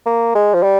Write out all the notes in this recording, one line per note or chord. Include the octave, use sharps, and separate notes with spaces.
A#3
G#3
F3
G3